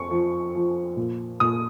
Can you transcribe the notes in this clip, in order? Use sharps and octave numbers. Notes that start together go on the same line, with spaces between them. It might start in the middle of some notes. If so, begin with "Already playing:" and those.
Already playing: F2 C4 C#6
F3
F3
A#2
A#2 D#6